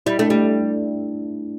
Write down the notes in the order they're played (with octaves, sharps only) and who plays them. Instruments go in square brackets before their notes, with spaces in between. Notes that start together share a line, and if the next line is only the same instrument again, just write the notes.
[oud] G3 [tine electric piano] E4
[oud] A3 [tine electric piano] D4
[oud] G3 [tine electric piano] A3